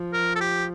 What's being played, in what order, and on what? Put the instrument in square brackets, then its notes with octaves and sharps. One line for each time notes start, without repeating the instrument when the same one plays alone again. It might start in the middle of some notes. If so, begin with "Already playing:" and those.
Already playing: [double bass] F3
[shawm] A#4
A4
G4